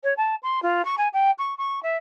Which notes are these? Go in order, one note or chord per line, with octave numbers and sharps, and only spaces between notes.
C#5
A5
C6
F4
C#6
G#5
G5
C#6
C#6
E5